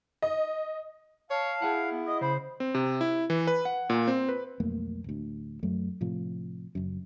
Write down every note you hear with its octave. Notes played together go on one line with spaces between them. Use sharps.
D#5
C#5 F5 A5
E4 G#4 F#5
B3
D#5 D#6
C#3 C5 B5
C4
C3
E4
E3
B4
F#5
A#2
C4
B4
B1 F2 A3 A#3
D1 D2
F#2 F#3 A3
A2 C3 F3
F#1 F#2